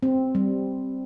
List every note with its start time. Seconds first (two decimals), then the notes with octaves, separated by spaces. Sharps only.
0.03 C4
0.35 G3